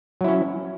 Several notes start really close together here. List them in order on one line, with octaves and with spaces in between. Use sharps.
F#3 E4 C#4